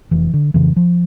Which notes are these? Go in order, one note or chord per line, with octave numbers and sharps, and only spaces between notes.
F1 E3
D3
F2 C#3 E3
F3